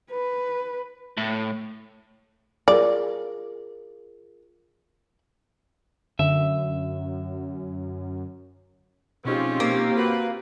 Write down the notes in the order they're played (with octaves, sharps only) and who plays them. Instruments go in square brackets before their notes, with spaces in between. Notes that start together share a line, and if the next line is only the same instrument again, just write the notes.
[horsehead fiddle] B4
[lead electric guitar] A2
[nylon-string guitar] F4 G#4 A#4 [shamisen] D5
[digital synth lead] F#2 [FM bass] D3 [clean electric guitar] E5
[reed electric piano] B2 D#4 [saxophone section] F3 G#3 C#4 [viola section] C4 F4 G4
[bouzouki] A#3
[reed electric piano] F#4 A#4 [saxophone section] B4